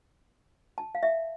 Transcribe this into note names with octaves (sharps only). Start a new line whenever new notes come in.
A5
F5
E5